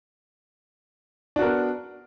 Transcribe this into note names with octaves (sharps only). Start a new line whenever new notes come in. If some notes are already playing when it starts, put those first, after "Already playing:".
B3 D4 F#4 A#4